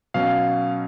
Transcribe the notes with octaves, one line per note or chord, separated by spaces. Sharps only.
B2 F#3 C#4 F5